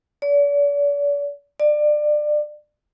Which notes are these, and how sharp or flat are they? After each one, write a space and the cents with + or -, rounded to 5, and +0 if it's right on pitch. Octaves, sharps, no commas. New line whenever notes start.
D5 -40
D5 +25